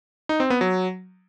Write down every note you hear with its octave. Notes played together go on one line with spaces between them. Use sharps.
D#4
C4
B3
F#3